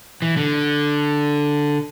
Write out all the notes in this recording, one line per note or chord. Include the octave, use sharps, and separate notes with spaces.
E3
D3